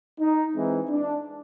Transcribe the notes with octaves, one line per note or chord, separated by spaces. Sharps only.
D#4
E3 G#3 C4
D4